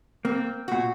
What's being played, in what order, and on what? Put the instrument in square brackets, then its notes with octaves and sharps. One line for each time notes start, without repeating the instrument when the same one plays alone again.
[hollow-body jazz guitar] A#3 [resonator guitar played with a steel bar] C4
[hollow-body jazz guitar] A#2 [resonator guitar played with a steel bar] F#4